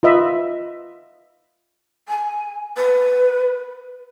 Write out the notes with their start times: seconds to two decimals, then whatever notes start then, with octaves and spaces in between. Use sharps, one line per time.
0.03 F4 B4 D#5 E5 B5
2.08 G#5
2.76 B4